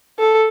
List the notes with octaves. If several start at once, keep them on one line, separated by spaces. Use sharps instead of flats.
A4